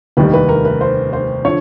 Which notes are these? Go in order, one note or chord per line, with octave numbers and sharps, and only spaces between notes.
F1 D#2 D#3 G3 B4
B4
A#4
B4
C5
C5
D3 F3 C#5